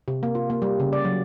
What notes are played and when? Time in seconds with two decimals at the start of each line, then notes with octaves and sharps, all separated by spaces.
0.08 C3
0.23 A#3
0.35 F4
0.50 A#3
0.62 G3
0.80 C#3
0.93 D5
1.05 F#3